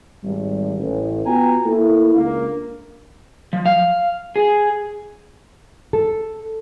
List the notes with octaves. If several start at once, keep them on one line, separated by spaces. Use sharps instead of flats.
G#1 G3
A1
B3 F4 F#4 G5 G#5 A#5
A#3 E4 A4
C#2 A#3 D4 A#4 F5
F3
F5
G#4
A4